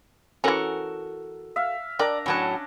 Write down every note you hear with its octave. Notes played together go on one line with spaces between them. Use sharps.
E3 C#4 F#4 A4 A#4
E5 F5
D4 A#4 D5 D#5 G5 A#5
A2 F#3 C#4 D4 A5